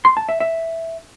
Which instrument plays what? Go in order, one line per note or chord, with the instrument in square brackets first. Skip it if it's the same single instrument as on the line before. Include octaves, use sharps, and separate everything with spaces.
[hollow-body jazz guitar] C6
A5
E5
E5